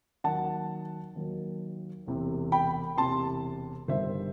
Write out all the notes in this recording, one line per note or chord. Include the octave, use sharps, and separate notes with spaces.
D#2 D#3 F#3 F#5 A5
D#2 D#3 F#3
E1 E2 C3
G5 B5
E1 E2 C3 A5 C6
G1 G2 D#3 G3 C5 E5